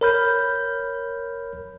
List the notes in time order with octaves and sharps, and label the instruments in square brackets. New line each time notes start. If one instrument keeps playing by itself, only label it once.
[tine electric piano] A#4 C#5 B5 F6 G6